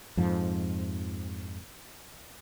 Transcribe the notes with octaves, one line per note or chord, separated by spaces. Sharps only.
F2 G#2 F3